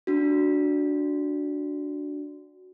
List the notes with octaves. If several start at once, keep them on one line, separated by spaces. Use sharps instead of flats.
D4 F#4